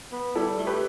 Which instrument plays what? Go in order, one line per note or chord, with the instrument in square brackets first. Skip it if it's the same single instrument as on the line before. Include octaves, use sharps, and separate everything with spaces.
[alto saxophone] B3
[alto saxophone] G3 [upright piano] E4 A4
[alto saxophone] A3
[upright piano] G4 B4